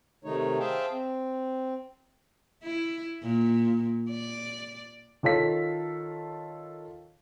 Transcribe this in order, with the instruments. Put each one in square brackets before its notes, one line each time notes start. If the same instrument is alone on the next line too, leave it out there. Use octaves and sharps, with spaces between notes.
[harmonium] C3 D#3 A3 D#4 C#5
G#4 C5 E5 F5 G5 A5
C4
[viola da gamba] E4
A#2
D5
[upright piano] D#3 F4 A4 C#5 F5 B6